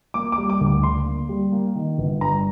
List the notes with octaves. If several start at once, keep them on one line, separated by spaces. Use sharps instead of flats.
A#3 D6
D6
G3
D6
D2
D6
D3 C6
A#3
G3
A#3
D#3
G1
G2 A#5